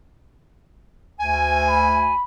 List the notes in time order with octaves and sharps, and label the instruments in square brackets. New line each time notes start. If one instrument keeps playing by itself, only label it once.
[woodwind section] D2 G#5
[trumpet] B5